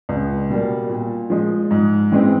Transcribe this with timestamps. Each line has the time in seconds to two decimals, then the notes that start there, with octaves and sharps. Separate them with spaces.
0.09 C#2
0.50 B2 G3 A#3
0.89 A#2
1.30 F3 G#3
1.71 G#2
2.12 E3 G#3 C4